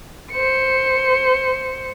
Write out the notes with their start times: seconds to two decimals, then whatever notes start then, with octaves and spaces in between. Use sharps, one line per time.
0.32 C5 C#7